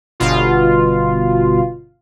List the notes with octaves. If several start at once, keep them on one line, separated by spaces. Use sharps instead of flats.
G1 B2 F4